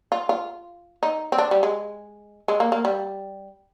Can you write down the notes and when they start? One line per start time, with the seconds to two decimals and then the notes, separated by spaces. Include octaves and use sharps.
0.12 F4
0.29 F4
1.03 D#4
1.32 C4
1.38 D4
1.51 G3
1.63 G#3
2.48 G#3
2.60 A#3
2.72 A#3
2.85 G3